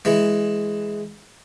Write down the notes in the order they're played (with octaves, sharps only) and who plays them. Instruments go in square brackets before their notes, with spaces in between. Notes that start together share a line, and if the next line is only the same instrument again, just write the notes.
[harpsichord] E3 G#3